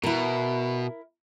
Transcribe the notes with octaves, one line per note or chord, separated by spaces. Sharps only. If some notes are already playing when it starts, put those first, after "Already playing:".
B2 E4 A#4